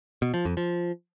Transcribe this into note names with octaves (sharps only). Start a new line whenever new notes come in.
B2
F3
F2
F3